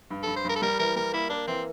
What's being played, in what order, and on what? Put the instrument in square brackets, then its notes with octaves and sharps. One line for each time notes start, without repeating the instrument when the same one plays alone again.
[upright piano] G2
[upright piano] G2 [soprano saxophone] A4
[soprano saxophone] C5
[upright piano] G2 [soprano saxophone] A#4
[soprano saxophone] A4
[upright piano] G3 [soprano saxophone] A#4
[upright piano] E3 [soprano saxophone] A#4
[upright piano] G3 [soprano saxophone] A#4
[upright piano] A#3 [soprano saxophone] E4
[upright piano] A#3 [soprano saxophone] D4
[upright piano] E3 [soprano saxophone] C4